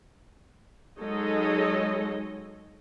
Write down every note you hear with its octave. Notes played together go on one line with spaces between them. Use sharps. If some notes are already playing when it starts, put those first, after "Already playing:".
F#3 G#3 D#4 A4 C#5 D#5